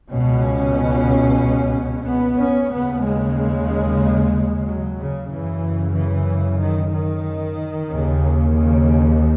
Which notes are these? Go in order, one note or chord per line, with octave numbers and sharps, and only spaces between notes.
C#2 B2 C#4
B3
C#4
D#2 C#3 B3
G#3
F#3
C#3
F#2 C#3 E3
E3
D#3
D#3
D#2 C#3
C#3